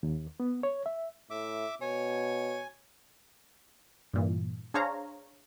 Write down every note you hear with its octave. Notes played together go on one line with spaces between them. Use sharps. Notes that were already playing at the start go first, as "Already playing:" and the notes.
D#2
B3
C#5
E5
A2 E5 D6
B2 C#5 G#5
G2 A#2 E3
D4 G#4 C5 C#5 F5 A#5